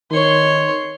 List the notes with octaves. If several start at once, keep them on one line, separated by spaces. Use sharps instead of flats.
D#3 C#5 C6